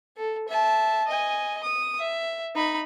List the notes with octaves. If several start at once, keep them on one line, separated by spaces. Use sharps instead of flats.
A4
E5 A5
D#5 G#5
D#6
E5
D#4 B5